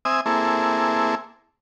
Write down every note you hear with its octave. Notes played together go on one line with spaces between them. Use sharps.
C4 E5 G#5 D#6
A#3 C4 E4 G#4 A4